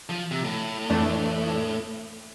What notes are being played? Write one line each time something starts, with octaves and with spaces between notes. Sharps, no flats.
F3
C3
A2
F2 E3 A3 D4